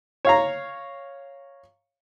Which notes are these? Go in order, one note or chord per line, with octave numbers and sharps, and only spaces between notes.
C#5 F5 A#5